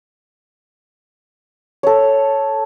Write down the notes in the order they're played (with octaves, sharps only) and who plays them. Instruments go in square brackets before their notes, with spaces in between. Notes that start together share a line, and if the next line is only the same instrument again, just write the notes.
[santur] A4 C#5